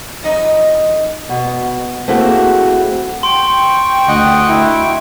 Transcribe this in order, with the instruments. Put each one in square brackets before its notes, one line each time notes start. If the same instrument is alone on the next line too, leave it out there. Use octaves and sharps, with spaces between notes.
[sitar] F2 D#4 D#5
[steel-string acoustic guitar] B2
A3 A#3 C4 E4 F#4 G#4
[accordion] G5 C#6 [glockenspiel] C6
[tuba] D2 [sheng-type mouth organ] D#5 F#5
[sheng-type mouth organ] E4